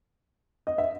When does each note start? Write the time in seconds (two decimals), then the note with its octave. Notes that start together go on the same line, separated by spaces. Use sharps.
0.67 D#5
0.78 E5